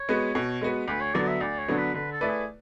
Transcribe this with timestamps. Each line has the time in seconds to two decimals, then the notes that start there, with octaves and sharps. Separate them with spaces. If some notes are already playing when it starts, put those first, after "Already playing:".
Already playing: C#5
0.09 G#3 B3 F#4 B4
0.35 B2
0.61 G#3 B3 F#4 B4
0.88 D2 B4
1.01 C#5
1.14 D3 F#3 B3 D4 D5
1.28 E5
1.41 D2 D5
1.58 C#5
1.68 D3 F#3 B3 D4
1.77 B4
1.94 D3 B4
2.12 A4
2.21 A3 E4 B4 D5
2.29 G#4